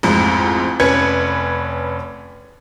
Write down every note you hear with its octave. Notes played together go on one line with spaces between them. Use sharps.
A1 F2 G#2
F1 C#4 B4 G#6 C#7